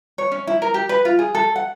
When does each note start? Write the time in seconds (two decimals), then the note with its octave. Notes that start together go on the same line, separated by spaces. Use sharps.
0.18 C#5
0.32 C#4
0.47 E4
0.62 A#4
0.74 G4
0.89 B4
1.05 F4
1.19 G#4
1.35 A4
1.56 F#5